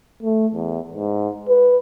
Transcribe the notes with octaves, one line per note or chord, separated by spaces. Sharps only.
A3
E2
G#2
B4